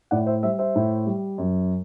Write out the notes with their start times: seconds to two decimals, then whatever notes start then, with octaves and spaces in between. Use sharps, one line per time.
0.11 A2 D5 F#5
0.26 C5 E5
0.43 G3 C5 E5
0.59 C5 E5
0.75 A2
1.07 G3
1.38 F#2